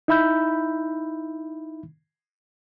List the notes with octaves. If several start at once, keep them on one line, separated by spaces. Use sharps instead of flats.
D#4 E4 E5 B5 E6 G6